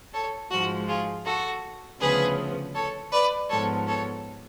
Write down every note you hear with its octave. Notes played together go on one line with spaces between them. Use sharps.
A4 C#5
G#2 F3 G#3 F#4
F4 G#4
F#4 A4
D2 C#3 F3 B3 G#4 B4
A4 C#5
B4 D5
G#2 F3 B3 A4 C#5
A4 C#5